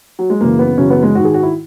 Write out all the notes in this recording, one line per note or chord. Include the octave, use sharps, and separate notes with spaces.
F#3
G#3
F#2 C#3 E3 A#3
B3
F#2 C#3 E3 C#4
B3
G#3
G#2 D#3 F#4
G#4
F#4
E4